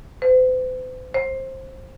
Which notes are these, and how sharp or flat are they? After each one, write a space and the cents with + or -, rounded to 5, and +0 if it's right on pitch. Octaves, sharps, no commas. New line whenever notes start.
C5 -45
C5 +20